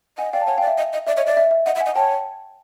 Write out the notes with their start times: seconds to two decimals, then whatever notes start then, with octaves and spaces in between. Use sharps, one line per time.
0.18 D#5 F#5 G#5
0.33 D5 F5 G5
0.41 A5
0.46 C#5 F#5 G#5
0.58 F5 G5
0.61 D5
0.67 E5
0.78 D#5
0.93 D#5
1.07 D5 E5
1.16 C#5 D#5
1.27 D5 E5
1.37 E5
1.51 E5
1.66 D#5 F#5
1.75 E5
1.80 F#5 G#5
1.86 D#5
1.96 C#5 G5 A5